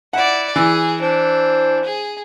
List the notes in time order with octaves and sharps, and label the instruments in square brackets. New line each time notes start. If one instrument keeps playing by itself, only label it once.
[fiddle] E4 D5 [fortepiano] F#5
[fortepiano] E3 [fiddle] G#4
[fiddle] D4 [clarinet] C5
[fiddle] G#4